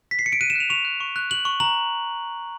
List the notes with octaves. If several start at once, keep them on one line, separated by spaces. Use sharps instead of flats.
B6
C7
C#7
D7
F#6 D#7
E7
F#6 F7
C#6 F7
F#6
C#6
F#6
F#6 F#7
C#6
A#5 F#7